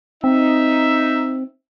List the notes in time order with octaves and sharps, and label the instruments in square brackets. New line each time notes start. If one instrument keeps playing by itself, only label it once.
[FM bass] C4 [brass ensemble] D#4 [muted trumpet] E5